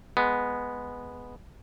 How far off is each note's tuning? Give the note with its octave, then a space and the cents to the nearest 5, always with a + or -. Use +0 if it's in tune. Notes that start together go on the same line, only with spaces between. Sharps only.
G#3 +0 B3 -5